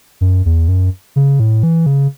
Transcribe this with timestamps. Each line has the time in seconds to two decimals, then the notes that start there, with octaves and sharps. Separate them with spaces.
0.21 F#2
0.46 E2
0.68 F#2
1.16 C#3
1.40 A2
1.63 E3
1.86 C#3